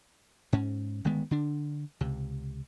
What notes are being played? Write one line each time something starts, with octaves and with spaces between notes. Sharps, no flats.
G#2 C#4
G1 D#3 G#3 B3
D3 D4
C#2 C3